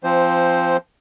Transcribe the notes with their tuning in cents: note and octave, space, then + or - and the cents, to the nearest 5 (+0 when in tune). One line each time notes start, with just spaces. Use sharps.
F3 -15 C4 +0 C5 +0